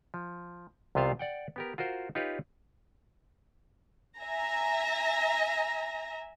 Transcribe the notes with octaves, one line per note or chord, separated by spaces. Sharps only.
F3
C2 C3 B3 F4 C5 F5
D5 F#5 G5
B3 G4 A#4
F4 F#4 A#4 C5
D#4 F4 G4 B4 C#5
E5 G#5 A#5 A#6